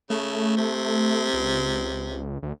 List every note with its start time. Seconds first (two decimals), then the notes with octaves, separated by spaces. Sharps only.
0.10 C#3 A3
0.57 C3
1.33 C#2
2.43 D2